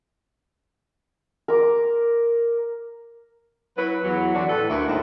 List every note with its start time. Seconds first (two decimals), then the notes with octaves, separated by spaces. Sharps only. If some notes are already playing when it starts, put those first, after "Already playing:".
1.48 A#4 D6
3.76 F#3 E4 B4
4.02 E2 E3 F#3
4.33 D3 E3 D4 F#4
4.47 A2 A4 B4
4.68 D2 A#3 E4 F#4
4.87 D#2 G#2 F3 G3 E5